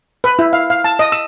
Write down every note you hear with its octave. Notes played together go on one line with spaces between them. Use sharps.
B4
E4
F5
F5
A5
D#5
E6